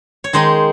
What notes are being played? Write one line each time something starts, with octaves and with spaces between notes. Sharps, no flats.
C#5
D#3 G#3 D#4 C5